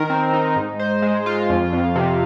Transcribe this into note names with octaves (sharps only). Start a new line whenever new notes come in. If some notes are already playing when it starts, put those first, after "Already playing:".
Already playing: D#3 A#4
C4
D#4
G#2
C5
G#3
F4
F2
F2
C3